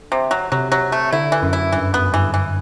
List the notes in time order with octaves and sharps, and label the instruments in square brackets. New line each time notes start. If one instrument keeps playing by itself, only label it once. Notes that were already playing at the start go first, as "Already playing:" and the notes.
Already playing: [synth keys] D3
[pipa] C3
F#3
[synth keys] C3 [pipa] F#3
[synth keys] C3 [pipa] F#3
[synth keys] C3 [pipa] A3
[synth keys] D3 [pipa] E4
[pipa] E3
[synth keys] F#2
[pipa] E4
[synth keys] G2 [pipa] E3
[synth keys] F#2 [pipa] B3
[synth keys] G2 [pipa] E3
[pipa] E3